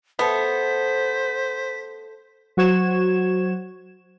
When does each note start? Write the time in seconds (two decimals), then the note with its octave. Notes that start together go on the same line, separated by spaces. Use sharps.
0.19 A3 B3 A4 C5 B6
2.57 F#3 F#4 C5 C#6 G#6 E7